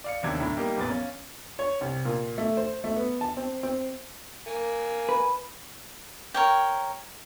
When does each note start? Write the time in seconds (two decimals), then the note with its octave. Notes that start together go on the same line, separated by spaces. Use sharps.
0.04 D5 F5 C#7
0.23 D#2 C3 F#3 D4 D6 G#6
0.40 A2 D3 A#5
0.56 G3 A#3 D#4 G4
0.77 F1 F#2 A#2 B3 A#5 A6
0.89 C#4 F5
1.59 C#5
1.81 C2
2.05 A#2
2.38 A3
2.57 C5
2.84 A3
2.96 B3
3.21 A5
3.37 C4
3.63 C4
4.46 A#3 F5 G#5
5.09 B4
6.34 A#4 C#5 G5